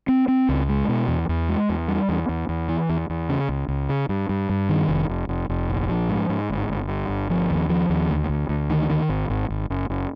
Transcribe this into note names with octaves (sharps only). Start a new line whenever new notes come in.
C4
C4
C#2
G#3
B2
E2
E2
G#3
E2
G3
E2
E2
E2
E3
E2
E2
C#3
C#2
C#2
C#3
G2
G2
G2
D#3
F1
F1
F1
F1
A#1
F3
G#2
G#2
G1
G1
G2
G1
F3
D#2
F3
D#2
D2
D2
D2
D#3
D#3
G#1
G#1
G#1
F#1
F#1